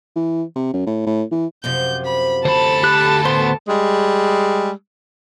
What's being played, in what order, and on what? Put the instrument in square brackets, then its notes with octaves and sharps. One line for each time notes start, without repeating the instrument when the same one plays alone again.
[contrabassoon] E3
C3
F#2
A2
A2
E3
[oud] F#2 C3 F3 [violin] G6
[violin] B5
[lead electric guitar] D2 B5 [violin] A4 A5 [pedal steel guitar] C5
[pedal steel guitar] G4 F#6
[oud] A2 [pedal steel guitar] B3 C5 C6
[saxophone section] G3 G#3